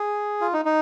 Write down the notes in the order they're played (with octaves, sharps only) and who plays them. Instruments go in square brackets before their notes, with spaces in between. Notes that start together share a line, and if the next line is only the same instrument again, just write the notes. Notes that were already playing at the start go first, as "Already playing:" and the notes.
Already playing: [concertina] G#4
F4
D#4
D#4